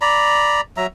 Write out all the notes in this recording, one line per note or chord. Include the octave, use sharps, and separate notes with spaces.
D5 A#5 B5
F#3 E5 A#5